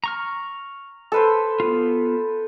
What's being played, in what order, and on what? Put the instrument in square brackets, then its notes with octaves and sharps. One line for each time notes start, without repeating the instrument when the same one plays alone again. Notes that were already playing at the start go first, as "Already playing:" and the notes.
[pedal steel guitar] A#5 C#6 F6
[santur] A4 B4 C5
[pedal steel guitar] B3 F4